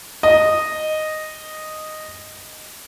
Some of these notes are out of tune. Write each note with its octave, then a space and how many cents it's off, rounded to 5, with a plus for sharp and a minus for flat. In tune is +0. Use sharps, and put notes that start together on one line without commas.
D#5 -5